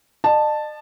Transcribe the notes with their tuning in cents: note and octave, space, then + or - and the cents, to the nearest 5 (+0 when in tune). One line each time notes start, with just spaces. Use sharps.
D#5 -45 A5 +0